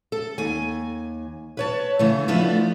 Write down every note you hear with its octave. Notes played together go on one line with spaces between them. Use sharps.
A4
D#2 G#5
B4 C#5 A5
C#3 E3 A3
F3 A3 B3 D4 E4